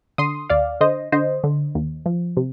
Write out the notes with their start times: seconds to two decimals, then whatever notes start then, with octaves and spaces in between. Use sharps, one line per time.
0.18 D3 C6 D#6
0.50 D#2 D5 F5
0.81 D3 C5 D#5
1.12 D3 C5 D#5
1.44 D3
1.75 D#2
2.06 F3
2.37 C3